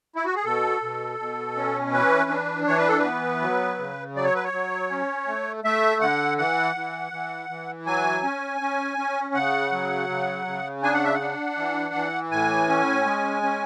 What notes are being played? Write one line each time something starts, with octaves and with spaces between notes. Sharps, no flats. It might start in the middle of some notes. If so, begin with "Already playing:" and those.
E4
F#4
G#4
B2 A4
B2
B2
C#4
E3 B4
D4
E3 C#5
B4
A4
B4
B3
F#3
C#3
F#3 D5
C#5
B4
C#5
F#3
C#4
A3
A3 E5
D3 F#5
E3 F#5
E3
E3
E3
F#3 G#5
C#4
C#4
C#4
C#3 F#5
F#3
C#3
C#3
D4 G#5
F#5
E5
F#5
D4
E3
E3
A2 G#5
C#4
G#3
C#4